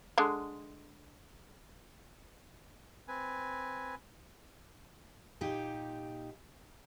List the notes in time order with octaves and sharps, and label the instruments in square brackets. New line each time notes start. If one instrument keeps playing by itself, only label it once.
[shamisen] D3 G#3
[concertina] C4 B4 G#5
[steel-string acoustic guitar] A#2 D#4 G4